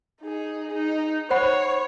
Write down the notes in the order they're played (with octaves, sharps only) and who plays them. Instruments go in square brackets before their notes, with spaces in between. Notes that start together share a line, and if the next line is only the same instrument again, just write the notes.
[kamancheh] D#4 G#4
D#4
[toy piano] C5 F#5 B5 [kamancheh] C#5